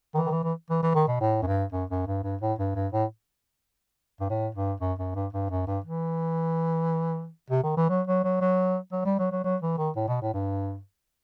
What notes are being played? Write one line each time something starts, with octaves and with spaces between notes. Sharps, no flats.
D#3
E3
D#3
E3
E3
E3
E3
D#3
B2
A2
F#2
G2
F#2
F#2
G2
G2
A2
G2
G2
A2
G2
A2
G2
F#2
F#2
G2
G2
F#2
G2
E3
C3
D#3
E3
F#3
F#3
F#3
F#3
F#3
G3
F#3
F#3
F#3
E3
D#3
A2
B2
A2
G2